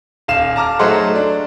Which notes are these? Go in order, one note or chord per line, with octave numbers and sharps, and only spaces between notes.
D#1 F5 E7
A5 A#5 D6 F6
F#3 A3 D#4 G#4 C5 F#5
D4